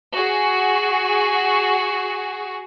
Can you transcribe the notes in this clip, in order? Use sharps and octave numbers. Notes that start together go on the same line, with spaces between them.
F#4 G#4